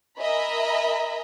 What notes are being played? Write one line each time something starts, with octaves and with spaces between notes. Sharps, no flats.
A#4 D#5 E5 G#5 A#5 B5